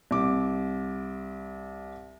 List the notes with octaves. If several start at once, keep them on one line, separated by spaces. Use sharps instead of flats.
C2 D6